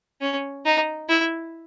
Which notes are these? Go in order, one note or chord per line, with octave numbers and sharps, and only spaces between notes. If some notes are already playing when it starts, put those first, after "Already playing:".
C#4
D#4
E4